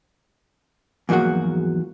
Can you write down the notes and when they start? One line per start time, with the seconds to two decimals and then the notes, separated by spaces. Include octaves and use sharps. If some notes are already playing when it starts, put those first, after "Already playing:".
1.09 E2 G#2 F3 F#3 A#3 F#4